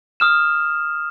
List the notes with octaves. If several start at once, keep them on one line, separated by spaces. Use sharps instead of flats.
D#6 F6 E7